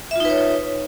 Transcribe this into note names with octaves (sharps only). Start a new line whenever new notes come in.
D#4 F4 B4 C#5 E5